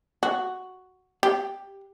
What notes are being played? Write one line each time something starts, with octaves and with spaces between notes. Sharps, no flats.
F#4
G4